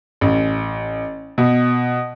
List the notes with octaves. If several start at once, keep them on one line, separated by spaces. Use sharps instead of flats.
A1
B2